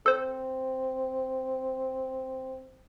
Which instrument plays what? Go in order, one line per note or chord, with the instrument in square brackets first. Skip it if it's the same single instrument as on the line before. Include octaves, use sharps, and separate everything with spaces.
[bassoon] C4 [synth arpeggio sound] A4 C5